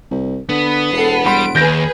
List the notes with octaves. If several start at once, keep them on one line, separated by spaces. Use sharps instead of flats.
C2
D3 B3
E1 A4 F#5 C7
G3 F#5 B5 C6 D7
D#2 G#4 B4 G6 A#6